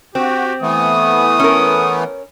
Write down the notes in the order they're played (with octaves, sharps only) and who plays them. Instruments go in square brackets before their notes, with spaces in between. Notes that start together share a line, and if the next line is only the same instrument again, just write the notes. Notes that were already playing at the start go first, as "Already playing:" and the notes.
[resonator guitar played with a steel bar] C4 [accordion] F#4 [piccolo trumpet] G4
[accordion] E3 A3 B3 [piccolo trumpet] D#6
[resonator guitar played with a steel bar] C#4 A#4